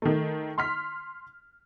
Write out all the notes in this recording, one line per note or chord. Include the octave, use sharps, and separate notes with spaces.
D#3 A3
C6 F6 B6